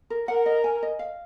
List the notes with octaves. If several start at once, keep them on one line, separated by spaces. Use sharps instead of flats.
A#4
A#4 F#5
D#5
G#5
D#5
F5